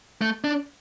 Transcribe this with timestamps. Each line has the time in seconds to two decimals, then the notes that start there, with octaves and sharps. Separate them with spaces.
0.21 A3
0.44 D4